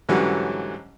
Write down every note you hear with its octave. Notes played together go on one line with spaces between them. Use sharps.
G#2 D3 E3 F#3 G3 C#4